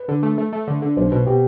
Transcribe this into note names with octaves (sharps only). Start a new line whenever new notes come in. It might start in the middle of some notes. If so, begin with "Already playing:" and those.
Already playing: B4
D3
A3
A3
A3
D3
D3
B1 C5
B2
B2 G4